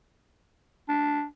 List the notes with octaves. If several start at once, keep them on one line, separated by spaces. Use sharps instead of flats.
D4